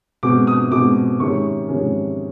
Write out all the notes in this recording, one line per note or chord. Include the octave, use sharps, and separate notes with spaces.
B2 G#3 C4 D6
D#6
B2 G#3 C4 D6
C3 D#3 G#3 C#4 C#6
C3 D#3 G#3 C#4